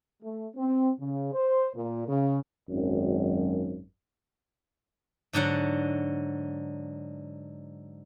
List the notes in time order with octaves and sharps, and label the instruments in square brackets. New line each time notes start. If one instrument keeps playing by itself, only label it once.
[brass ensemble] A3
C4
C#3
C5
A#2
C#3
G#1 F#2
[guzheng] G#2 D3 F#3 F#5